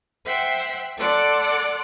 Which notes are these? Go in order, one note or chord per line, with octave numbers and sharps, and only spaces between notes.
C5 E5 F#5 G5
A4 D5 F#5 C6 D6